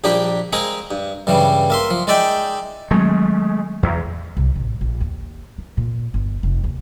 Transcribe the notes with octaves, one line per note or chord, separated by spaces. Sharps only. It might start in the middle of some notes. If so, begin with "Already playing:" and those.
A#1 G3 A#3 D4 G4 D6
G#3 A#3 C4 G#4 A#4
G2
G2 C#3 E3 G3
A#3 E5 C6
F3
G#3 D#4 D5 E5 G5
D#3 F#3 G#3 A3 C4
E2
C2
A1
A#1
D#2
D#3
A#2
G1
F1
D#2